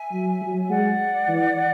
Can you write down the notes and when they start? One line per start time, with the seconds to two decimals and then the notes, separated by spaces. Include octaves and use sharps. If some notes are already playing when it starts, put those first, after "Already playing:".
Already playing: E5 G#5
0.12 F#3
0.41 F#3
0.60 E5
0.69 G#3 D5 F#5
1.29 E3